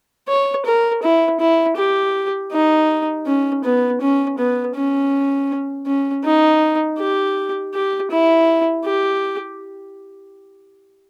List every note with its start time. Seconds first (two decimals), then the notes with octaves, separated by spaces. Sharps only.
0.28 C#5
0.66 A#4
1.02 E4
1.40 E4
1.77 G4
2.52 D#4
3.26 C#4
3.64 B3
4.01 C#4
4.38 B3
4.75 C#4
5.87 C#4
6.25 D#4
6.99 G4
7.74 G4
8.11 E4
8.85 G4